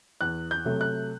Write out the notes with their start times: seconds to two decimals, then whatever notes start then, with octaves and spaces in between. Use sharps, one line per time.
0.21 E2 F#6
0.51 G6
0.65 C3 F#3 A3
0.81 F#6